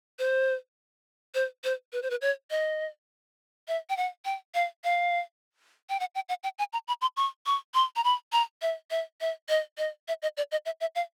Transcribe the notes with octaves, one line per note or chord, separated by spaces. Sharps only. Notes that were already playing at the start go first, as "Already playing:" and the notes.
C5
C5
C5
B4
C5
B4
C#5
D#5
E5
G5
F#5
G5
F5
F5
G5
F#5
G5
F#5
G5
G#5
A#5
B5
C6
C#6
C#6
C6
A#5
B5
A#5
E5
E5
E5
D#5
D#5
E5
D#5
D5
D#5
E5
E5
F5